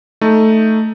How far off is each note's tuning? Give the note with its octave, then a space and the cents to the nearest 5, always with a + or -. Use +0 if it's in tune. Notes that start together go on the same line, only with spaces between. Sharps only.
A3 +0 D#4 +0